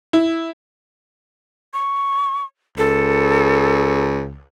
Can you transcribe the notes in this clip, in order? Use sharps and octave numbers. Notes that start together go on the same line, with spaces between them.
E4
C#6
C#2 A4